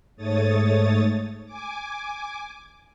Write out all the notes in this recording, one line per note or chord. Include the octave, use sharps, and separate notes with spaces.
G#2 A3 C#5 D#6 A6
G#5 D6